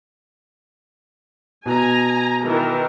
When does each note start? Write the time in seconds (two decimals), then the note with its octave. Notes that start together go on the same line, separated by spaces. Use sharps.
1.66 B2 G#5 A#5
2.45 D#3 E3 A#4